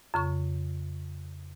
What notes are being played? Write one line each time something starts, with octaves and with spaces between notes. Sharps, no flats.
F2 C#3 C#6